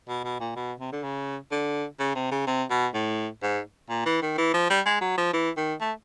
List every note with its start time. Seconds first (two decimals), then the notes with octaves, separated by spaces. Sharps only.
0.08 B2
0.24 B2
0.40 A#2
0.56 B2
0.80 C3
0.92 D3
1.03 C#3
1.51 D3
1.99 C#3
2.15 C3
2.31 C#3
2.47 C3
2.70 B2
2.94 A2
3.43 G#2
3.90 A#2
4.06 E3
4.22 D#3
4.38 E3
4.54 F3
4.70 G3
4.86 G#3
5.01 F#3
5.17 F3
5.33 E3
5.57 D#3
5.81 A3